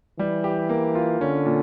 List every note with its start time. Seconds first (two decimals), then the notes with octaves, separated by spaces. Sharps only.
0.19 E3 G3
0.44 G4
0.69 A#3
0.95 F4
1.21 D3 C#4
1.46 A#2